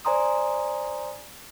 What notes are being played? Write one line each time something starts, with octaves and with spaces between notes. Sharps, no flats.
C5 D5 G#5 A#5 C6 D#6